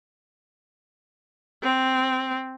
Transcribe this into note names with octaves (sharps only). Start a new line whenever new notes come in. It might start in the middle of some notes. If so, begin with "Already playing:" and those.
C4